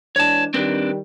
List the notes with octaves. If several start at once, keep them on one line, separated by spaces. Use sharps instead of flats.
E3 G#3 D4 C#5 A5
D#3 G3 C4 D4 B4